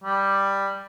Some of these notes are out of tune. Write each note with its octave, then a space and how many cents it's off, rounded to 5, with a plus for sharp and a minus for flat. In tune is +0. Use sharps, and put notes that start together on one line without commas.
G3 +5